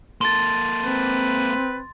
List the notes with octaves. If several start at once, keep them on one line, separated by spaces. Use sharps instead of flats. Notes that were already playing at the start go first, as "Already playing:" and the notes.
A#3 A4 C6 A6
C4 B4